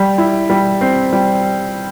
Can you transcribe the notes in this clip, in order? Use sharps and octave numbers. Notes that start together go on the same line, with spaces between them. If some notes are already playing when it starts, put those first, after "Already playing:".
Already playing: G3
E4
G3
C4
G3